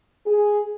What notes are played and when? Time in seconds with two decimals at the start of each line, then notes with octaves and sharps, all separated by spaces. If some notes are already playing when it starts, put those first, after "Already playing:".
0.27 G#4